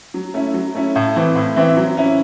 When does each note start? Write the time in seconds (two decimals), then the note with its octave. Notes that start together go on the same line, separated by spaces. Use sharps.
0.14 F#3
0.34 A3 C#4 E4
0.54 F#3
0.75 A3 C#4 E4
0.96 A2
1.16 E3 C4 E4
1.36 A2
1.56 E3 C4 E4
1.77 F#3
1.97 C#4 E4